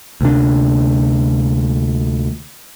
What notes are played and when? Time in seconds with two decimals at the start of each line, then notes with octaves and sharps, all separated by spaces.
0.21 D2 C3 D4